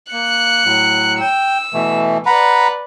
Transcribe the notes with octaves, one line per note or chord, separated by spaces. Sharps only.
A#3 F#6 C#7
A2 F#3
G5 E6
B2 E3 A3
B4 D5 F#5 A#5 B5